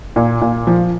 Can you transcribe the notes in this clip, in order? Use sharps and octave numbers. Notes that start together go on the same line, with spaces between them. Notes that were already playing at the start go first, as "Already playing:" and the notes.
A#2
A#2
F3